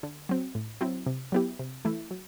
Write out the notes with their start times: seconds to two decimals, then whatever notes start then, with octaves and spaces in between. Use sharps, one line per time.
0.03 D3
0.29 F#3 C4
0.55 A2
0.81 F#3 C4 E4
1.06 C3
1.32 F#3 B3 E4 G4
1.59 C3
1.85 E3 A3 E4
2.11 F#3